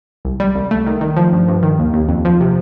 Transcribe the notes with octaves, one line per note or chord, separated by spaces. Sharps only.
C2
G3
C2
A3
D#3
D#3
F3
G2
G2
D#3
D#2
D#2
F2
F3
C3